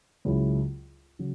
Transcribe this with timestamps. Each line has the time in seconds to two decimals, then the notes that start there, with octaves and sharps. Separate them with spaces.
0.25 C#2 C#3 F#3 C#4 E4
1.19 C#3 F#3